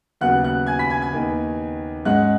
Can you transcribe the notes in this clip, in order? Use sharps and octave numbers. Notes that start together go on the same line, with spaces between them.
D#2 C#3 F#3 B3 F#5 F#6
F#5 F#6
G#5 G#6
B5 B6
G#5 G#6
G#5 G#6
D#2 D#3 B3
G#2 G#3 C#4 F#5 F#6